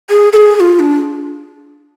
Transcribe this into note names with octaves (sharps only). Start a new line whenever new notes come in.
G#4
A4
G#4
G#4
F4
D4